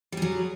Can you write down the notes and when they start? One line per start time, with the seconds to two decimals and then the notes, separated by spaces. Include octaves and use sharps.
0.12 G3
0.17 G#4
0.22 F#3